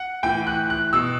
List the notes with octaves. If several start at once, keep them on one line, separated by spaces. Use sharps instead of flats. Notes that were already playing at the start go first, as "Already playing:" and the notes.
Already playing: F#5
A2 E3 G5
F#6
F#6
B2 E6